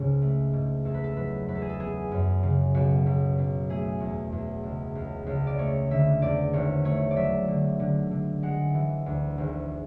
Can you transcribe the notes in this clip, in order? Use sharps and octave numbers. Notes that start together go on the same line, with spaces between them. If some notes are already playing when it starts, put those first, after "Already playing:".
Already playing: C#2 G#2 C#3 C#4
A3
G#2
E2 A4
B4
A4
F#3 B4
E2 B4
A4
G#4
A4
B3 G#4
F#2
C#3
B1 F#4
B1
B1
A3 G#4
E2
E2
C#2
C#2
C#2
D5
A3 C#5
D3 E5
E2 D5
G#1 C#5
A3 C#5
D5
F#3 E5
D3
D3
D3
G#3 F#5
E3
D2
G#1